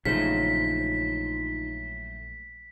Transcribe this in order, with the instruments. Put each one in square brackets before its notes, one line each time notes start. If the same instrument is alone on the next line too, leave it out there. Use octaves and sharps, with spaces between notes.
[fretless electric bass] A#1 C#3 [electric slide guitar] F#3 A3 C5 [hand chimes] D#4 F4 [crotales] B6